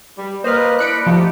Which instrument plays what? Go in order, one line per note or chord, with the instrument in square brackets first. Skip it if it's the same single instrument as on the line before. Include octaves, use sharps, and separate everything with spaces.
[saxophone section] G3
[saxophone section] A#3 [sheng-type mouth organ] B4 D#5 [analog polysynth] C5 F6
[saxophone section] D4 E4 D5 [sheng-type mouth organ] B5 [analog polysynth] F#6 C#7 D7
[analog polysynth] F3 [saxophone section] A3 D#4 F4 [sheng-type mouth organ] G4